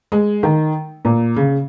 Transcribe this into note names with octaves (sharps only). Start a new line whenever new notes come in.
G#3
D#3
A#2
C#3